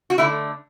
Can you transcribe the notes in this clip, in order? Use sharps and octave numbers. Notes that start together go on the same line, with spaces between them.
F#4
D3 A3 E4